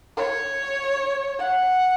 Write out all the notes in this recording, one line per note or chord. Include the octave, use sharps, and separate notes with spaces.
C#5
F#5